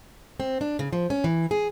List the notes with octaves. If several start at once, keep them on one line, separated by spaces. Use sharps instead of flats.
C4
D4
C#3
F3
C#4
E3
G#4